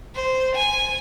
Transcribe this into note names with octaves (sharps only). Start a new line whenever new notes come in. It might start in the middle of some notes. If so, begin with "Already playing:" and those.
C5
G#5